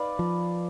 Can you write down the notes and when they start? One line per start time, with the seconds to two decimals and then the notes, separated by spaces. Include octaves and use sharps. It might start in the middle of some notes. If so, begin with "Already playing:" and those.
Already playing: D#4 B4 D5 F5
0.19 F3